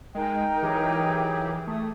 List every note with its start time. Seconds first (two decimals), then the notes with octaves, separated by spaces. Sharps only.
0.15 G#3 D#4 A#4 G5
0.63 E3 F#3 G4 G#4
1.68 A3 D#6